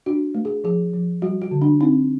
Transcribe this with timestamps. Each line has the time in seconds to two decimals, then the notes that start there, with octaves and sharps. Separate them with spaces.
0.06 D4 F#4
0.35 A3
0.45 G#4
0.64 F3 G#4
0.94 F3
1.22 G3 F#4
1.42 F#4
1.51 D3
1.61 D4
1.81 C4 D#4